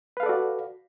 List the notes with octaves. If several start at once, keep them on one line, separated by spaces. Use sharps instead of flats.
F#4 A4 B4 D5 F5